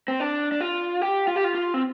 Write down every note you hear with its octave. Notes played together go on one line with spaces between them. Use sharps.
C4
D4
D4
F4
G4
F4
G4
F4
F4
C4